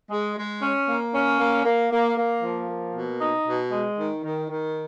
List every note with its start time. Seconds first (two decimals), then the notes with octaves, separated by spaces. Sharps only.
0.10 G#3
0.37 G#3
0.62 C#4
0.88 A#3
1.14 C#4
1.39 A#3
1.65 A#3
1.91 A#3
2.17 A#3
2.43 F3
2.68 A#3
2.94 B2
3.20 D#4
3.46 B2
3.72 G#3
3.98 D#3
4.23 D#3
4.49 D#3